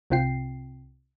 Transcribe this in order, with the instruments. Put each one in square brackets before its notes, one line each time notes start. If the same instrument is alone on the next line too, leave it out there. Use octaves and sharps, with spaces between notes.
[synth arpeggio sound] C2 C3 C4 F4 G5 C7